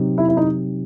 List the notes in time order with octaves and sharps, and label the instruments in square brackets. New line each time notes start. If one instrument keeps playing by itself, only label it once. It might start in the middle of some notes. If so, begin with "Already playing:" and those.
Already playing: [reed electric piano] C3 F#3 C4 D#4 G4
[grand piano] E4
E4
D#4